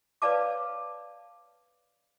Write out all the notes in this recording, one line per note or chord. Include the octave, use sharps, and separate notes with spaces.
B4 C#5 D5 F5 A5 D6